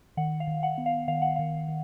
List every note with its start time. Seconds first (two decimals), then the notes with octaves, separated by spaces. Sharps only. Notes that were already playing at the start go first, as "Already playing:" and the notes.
0.17 D#3 F#5
0.40 F5
0.47 D#3
0.63 F#5
0.78 B3
0.86 F5
1.08 D#3 F5
1.22 F#5
1.36 D#3 F5
1.68 D#3